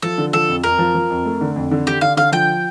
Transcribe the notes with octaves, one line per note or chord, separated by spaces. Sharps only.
F3 A4
D3
F3 A4
F2
F2 A#4
F3
F3
F2
A3
D3
F2
D3
D3 G4
D3 F5
D3 F5
F3 G5